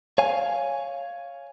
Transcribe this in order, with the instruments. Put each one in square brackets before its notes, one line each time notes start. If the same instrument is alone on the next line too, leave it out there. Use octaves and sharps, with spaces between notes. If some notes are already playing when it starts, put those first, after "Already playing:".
[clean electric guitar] C#5 F5 G#5